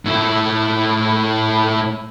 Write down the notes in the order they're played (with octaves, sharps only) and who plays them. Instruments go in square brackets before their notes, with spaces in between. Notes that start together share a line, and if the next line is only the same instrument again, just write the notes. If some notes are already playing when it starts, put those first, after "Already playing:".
[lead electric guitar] A2 E4